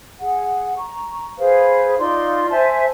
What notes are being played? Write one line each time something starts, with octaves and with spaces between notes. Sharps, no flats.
G#4 F#5
A#5 C#6
G#4 B4 C5 F5
D#4 F4 D5 C6
C5 E5 G#5 A5